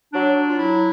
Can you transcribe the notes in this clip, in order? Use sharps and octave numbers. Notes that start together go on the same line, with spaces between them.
F#3 D4
F#3
F4
F#3 E4